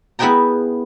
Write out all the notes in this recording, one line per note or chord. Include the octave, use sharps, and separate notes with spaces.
B3 E4 G#4 B4 G5 A#5